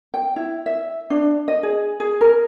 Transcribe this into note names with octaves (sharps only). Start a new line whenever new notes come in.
G5
E4
E5
D4
D#5
G#4
G#4
A#4